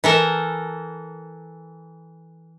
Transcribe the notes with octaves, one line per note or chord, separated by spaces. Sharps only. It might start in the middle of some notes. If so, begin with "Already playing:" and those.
E3 A4 A#4